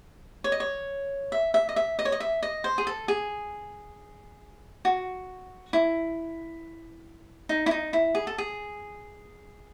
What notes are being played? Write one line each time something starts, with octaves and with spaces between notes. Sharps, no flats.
C#5
D#5
C#5
E5
E5
D#5
E5
D#5
C#5
D#5
E5
D#5
C5
G#4
A4
G#4
F#4
E4
D#4
E4
D#4
E4
G#4
A4
G#4